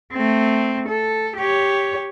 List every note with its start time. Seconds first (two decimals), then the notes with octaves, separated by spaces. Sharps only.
0.13 A3 C4
0.88 A4
1.36 G4 C#5